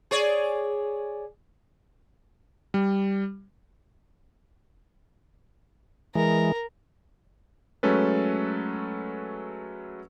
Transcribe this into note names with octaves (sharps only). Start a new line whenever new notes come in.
G#4 C#5 D5
G3
E3 G#3 A#4
F#3 G#3 A3 C#4 A4 B4